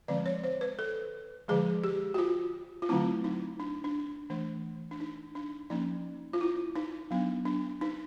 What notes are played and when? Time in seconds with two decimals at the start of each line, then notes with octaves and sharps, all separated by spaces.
0.08 D3 F3 G#3 C4 D5
0.26 C#5
0.44 C5
0.61 B4
0.79 A4
1.48 D3 F3 G#3 G#4
1.84 G4
2.14 F#4
2.18 F4
2.82 F4
2.89 D3 F#3 A3 C4 E4
3.24 D#4
3.60 D4
3.84 D4
4.30 E3 A3 D4
4.91 D4
5.00 D#4
5.35 D4
5.70 F3 A#3 C#4 D#4
6.33 F4
6.41 E4
6.75 D#4
7.11 F#3 B3 D4
7.45 D4
7.81 D#4